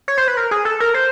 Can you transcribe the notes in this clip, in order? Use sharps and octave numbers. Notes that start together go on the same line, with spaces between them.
C#5
C5
B4
A#4
G#4
A4
A#4
C5